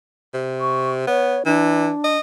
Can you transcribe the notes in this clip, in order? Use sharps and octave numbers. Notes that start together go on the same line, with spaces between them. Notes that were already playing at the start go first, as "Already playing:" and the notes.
C3
C#6
B3 C#5
E3 D4
D#5